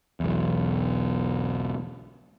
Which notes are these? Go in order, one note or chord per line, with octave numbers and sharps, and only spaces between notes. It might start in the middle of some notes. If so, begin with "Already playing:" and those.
B1 E2